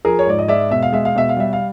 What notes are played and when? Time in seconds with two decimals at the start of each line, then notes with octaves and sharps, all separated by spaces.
0.05 F3 G#4 A#4
0.19 C#5
0.27 G#2 D5
0.39 D#5
0.48 G#3 D5 E5
0.71 B2 E5
0.83 F5
0.92 G#3 E5
1.05 F5
1.16 B2 E5
1.29 F5
1.37 G3 E5
1.53 F5